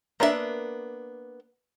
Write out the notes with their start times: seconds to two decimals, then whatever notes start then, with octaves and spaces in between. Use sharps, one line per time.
0.20 A#3 B3 D4 A4 E5